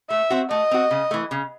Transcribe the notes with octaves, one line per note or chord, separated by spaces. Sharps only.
A3 E5
C4 F#4
A3 D#5
C4 F#4
C#3
E3 A3
C#3